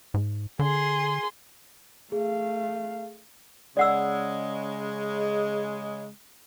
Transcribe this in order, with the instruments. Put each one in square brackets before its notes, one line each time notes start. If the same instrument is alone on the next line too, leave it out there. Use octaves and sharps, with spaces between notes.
[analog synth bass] G#2
[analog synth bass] D3 [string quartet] G#4 C6
[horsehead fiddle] A3 F5 [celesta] G#4
[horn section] C#3 G#3 [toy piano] D5 F#5 E6